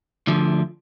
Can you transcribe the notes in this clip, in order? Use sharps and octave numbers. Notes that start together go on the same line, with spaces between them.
D2 D3 F3